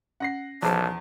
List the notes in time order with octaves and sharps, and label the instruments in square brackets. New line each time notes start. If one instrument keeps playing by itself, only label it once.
[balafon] C#4 [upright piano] F#5 A#6 C7
[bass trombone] B1 [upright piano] E2 [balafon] F3 G#4 C5 [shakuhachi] A5